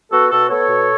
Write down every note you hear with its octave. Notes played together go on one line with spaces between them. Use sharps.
B3 F#4 A4
B2 F#4 A4
B3 A4 C#5
B2